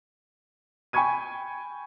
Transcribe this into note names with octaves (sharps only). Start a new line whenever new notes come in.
G5 G#5 B5 C#6 G#6 D#7